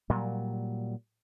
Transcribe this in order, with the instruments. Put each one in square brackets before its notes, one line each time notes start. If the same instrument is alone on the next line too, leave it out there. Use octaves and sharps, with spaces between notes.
[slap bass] A#2 F#3 G3